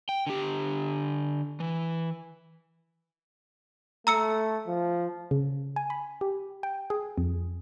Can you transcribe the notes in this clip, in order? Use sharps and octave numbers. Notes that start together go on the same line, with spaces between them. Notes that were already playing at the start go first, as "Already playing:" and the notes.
G5
D3 G4
E3
A3 A#5 E6 C#7
F3
C#3
G#5
B5
G4
G5
G#4
F2